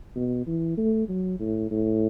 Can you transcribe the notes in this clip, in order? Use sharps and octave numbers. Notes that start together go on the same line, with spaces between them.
B2
E3
A3
F#3
A2
A2